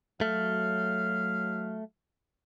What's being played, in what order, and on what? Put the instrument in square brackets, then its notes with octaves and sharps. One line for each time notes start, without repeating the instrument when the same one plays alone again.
[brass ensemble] F#3 [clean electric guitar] A3 [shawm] F5